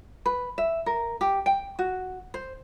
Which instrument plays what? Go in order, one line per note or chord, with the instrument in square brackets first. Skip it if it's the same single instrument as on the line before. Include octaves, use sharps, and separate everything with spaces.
[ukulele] B4
E5
A#4
G4
G5
F#4
C5